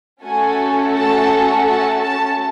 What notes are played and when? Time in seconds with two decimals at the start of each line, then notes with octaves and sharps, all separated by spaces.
0.24 A3 C#4 F#4 A4 G#5
0.95 A5
1.68 A5
2.03 A5